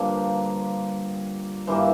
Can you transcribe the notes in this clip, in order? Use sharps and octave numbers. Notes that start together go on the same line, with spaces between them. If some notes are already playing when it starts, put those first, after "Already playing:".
Already playing: G2 D3 F3 A#3
G2 E3 G3 A#3 C5